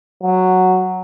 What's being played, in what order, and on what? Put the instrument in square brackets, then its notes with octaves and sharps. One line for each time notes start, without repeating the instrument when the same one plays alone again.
[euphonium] F#3